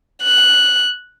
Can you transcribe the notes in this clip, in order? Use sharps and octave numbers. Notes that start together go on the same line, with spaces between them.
F#6